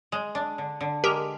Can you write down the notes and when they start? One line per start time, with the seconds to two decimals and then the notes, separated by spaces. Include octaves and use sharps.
0.12 G#3
0.35 D4
0.58 D3
0.81 D3
1.04 G#3 G4 A#4